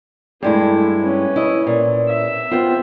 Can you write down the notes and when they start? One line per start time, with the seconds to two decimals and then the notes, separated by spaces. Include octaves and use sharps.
0.43 G2 G#3 A3 E4
1.00 C#4 B4
1.36 E4 D#5
1.67 A#2
2.08 E5
2.51 B3 C4 F4